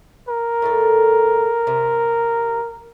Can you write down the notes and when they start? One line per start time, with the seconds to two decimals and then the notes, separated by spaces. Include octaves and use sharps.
0.28 A#4
0.62 A2 G3 A4
1.67 C3